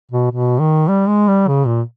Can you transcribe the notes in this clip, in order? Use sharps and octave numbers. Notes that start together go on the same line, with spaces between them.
B2
B2
D#3
G3
G#3
G3
C#3
A#2